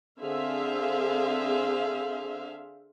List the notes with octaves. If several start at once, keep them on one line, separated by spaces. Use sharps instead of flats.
D3 C4 G#4 C5 E5 F5